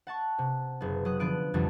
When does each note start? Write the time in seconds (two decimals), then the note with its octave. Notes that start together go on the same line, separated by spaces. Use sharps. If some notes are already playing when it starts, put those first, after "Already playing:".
0.07 F#5 A5 C#6
0.38 C3
0.81 F#1 B3
1.05 F#3 D#6 F#6
1.19 D3 F3 B3 F#6 D7 D#7
1.54 C2 F2 D3 E3 F#3 G3